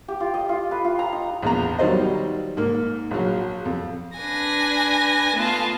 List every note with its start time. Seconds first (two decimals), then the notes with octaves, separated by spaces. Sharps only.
0.08 G4
0.20 F4
0.34 D#5
0.49 F4
0.71 B4
0.85 F4
0.99 A#5
1.13 D#4
1.42 A#1 E2 A#5
1.79 D#3 F#3 G3 C5 D#5
2.57 G#2 A#3
3.11 A#1 F#3
3.65 F2
4.17 D4 B4 G#5 A#6
5.35 A3 B3 F4 A5